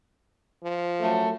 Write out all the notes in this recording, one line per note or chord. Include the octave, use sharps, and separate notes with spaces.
F3
F#2 A3